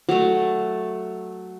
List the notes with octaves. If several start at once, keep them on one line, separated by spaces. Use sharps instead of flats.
F#3 A3